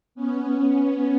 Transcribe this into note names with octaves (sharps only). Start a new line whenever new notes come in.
B3 C#4